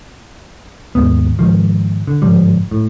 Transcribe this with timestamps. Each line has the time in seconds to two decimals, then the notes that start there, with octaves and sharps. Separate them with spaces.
0.95 D#2 G#2 B3
1.39 G#2 D#3 F3
2.07 D3
2.22 G1 G#2 F3 G3
2.71 A2